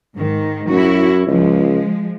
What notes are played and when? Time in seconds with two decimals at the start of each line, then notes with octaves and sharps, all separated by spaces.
0.16 G#2 D#3
0.69 F#2 E4 F#4
1.27 C#2 F3 G#3